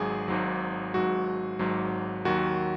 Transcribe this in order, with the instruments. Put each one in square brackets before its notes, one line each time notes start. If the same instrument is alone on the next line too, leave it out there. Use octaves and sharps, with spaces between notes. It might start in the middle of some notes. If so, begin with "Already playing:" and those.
Already playing: [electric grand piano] G#1 G#2 F#3 G#4
G#1 G#2 F#3
G#1 G#2 F#3 F#4
G#1 G#2 F#3
D#2 D#3 F#3 F#4